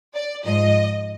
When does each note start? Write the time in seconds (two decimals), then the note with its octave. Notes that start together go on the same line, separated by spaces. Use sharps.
0.14 D5
0.44 G#2 F3 D#5